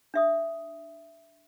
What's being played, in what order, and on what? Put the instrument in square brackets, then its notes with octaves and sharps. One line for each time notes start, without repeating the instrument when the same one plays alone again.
[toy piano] D4 E5 D#6